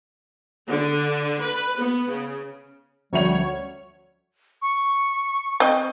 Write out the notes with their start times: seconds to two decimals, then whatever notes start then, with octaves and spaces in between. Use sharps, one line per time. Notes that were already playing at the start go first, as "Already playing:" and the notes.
0.68 D3
1.41 B4
1.78 B3
2.09 C#3
3.13 D2 F3 G3 C#4 C#5 E5 F7
4.62 C#6
5.60 C4 D#5